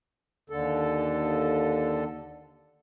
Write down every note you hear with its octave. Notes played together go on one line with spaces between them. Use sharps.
D#2 D3 A4